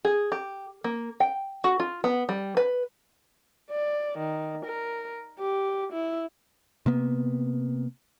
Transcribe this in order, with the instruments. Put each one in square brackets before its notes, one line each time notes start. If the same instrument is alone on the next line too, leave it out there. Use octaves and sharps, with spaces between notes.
[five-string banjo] G#4
G4
A#3
G5
F#4
F4
B3
G3
B4
[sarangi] D5
D#3
A#4
G4
E4
[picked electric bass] C3 A#3 B3